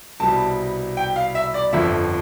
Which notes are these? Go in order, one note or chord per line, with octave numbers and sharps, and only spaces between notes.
C2 B2 G3 A5
G5
F5
E5
D5
G1 F2 D3 F3 E5